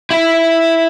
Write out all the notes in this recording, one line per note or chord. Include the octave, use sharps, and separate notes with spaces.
E4